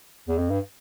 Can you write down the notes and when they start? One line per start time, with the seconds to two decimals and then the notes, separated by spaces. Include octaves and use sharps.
0.28 E2
0.38 F2
0.50 G2